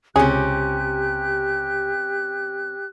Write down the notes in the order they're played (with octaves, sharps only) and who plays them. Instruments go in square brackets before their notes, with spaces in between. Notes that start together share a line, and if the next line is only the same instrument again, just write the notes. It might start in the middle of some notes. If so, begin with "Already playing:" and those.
[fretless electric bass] C#2 [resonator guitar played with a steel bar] C3 C#4 [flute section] G4 F#6 [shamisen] G#4